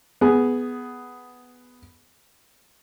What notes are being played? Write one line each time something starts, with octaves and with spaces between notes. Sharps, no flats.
B3 G#4